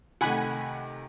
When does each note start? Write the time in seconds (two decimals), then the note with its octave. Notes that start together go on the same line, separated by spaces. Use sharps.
0.21 C3 D#3 A3 F#5 G#5 B5